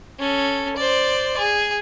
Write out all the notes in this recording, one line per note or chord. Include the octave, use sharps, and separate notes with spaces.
C#4 A4
C5 D5
G#4